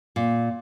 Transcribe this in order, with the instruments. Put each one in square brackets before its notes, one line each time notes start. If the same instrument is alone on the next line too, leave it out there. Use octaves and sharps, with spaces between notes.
[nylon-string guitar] A#2